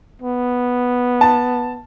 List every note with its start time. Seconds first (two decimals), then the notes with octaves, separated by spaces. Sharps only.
0.22 B3
1.21 A5